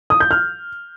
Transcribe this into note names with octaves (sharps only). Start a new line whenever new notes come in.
D#6
G6
F6